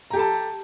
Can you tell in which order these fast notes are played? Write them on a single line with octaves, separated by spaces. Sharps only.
A#5 G4 A4 A5